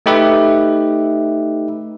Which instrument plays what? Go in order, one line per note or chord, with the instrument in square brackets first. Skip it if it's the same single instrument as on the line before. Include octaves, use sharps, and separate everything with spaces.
[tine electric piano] A3 D#4 G4 B4 E5